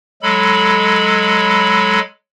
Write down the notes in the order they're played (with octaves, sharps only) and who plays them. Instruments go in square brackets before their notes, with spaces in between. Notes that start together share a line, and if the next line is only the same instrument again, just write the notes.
[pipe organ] F#3 G#3 A4 B5